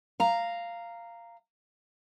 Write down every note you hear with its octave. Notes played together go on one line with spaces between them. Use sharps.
F5 A#5